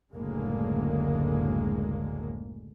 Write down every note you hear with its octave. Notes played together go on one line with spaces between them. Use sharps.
F#1 D2 A2 D3 G#3 A#3